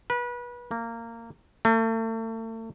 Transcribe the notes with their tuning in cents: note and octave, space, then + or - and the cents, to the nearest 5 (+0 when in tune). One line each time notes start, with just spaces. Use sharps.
B4 -30
A#3 -20
A3 +40